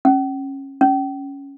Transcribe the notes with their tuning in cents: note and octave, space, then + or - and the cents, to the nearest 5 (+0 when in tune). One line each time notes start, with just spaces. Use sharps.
C#4 -25
C#4 +5